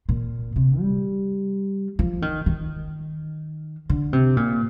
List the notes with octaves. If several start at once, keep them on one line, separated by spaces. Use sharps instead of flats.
A#2
C3
G3
F3
D#3
D#3
D3
C3
A#2